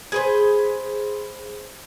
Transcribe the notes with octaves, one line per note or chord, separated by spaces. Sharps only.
G#4 B4 C5